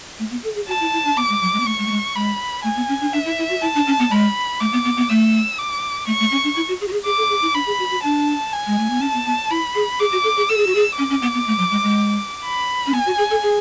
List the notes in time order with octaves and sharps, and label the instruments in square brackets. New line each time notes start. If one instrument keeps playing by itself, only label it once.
[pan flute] A3
B3
A4
G#4
[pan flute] F#4 [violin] A5
[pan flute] E4
E4
D4
[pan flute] B3 [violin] D6
[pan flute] G#3
F#3
G#3
B3
[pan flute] A3 [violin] C#6
[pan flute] G#3
A3
G#3
[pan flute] G#3 [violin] B5
[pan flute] A3 [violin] G#5
[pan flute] B3
C#4
D4
[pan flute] D4 [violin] E5
[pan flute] E4
E4
F#4
[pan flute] E4 [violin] A5
[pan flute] D4
C#4
B3
[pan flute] G#3 [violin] B5
[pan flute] A3 [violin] D6
[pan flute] B3
B3
B3
[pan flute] A3 [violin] E6
[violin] D6
[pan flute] A3 [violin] C#6
[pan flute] A3
C#4
D4
E4
F#4
G#4
F#4
G#4
[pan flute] G#4 [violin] D6
[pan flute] A4
G#4
E4
[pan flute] D4 [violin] B5
[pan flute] G#4
F#4
F#4
[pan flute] D4 [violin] A5
[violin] G#5
[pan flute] G#3
A3
B3
[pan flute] C#4 [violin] A5
[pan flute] B3
B3
[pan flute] E4 [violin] B5
[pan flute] G#4
[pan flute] G#4 [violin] D6
[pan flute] F#4
A4
G#4
[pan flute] A4 [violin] E6
[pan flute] G#4
F#4
G#4
[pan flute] C#4 [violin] D6
[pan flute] C#4
B3
B3
A3
F#3
G#3
G#3
[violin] B5
[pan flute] C#4
[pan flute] B3 [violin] G#5
[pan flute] F#4
G#4
A4
G#4